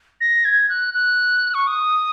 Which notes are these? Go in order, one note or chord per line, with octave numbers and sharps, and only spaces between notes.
A#6
G#6
F#6
F#6
C#6
D#6